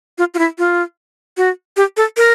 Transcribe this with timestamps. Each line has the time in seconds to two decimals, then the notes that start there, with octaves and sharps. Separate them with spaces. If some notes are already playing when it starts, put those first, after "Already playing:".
0.18 F4
0.34 F4
0.39 E4
0.58 F4
1.37 F#4
1.77 G4
1.97 A4
2.17 A#4